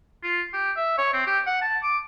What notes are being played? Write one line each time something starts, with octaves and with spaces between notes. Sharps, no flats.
F4
G4
E5
C#5
C4
G4
F#5
A5
D6